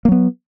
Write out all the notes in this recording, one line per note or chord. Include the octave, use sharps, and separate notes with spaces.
F#3 A#3 B3